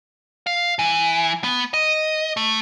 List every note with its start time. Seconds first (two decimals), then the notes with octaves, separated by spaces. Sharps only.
0.47 F5
0.79 E3
1.44 B3
1.74 D#5
2.37 A3